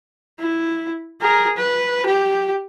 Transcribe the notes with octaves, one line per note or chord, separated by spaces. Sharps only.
E4
G#4 A#4
B4
G4